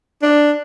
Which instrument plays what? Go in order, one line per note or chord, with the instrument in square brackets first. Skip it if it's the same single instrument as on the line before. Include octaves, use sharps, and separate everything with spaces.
[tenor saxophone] D4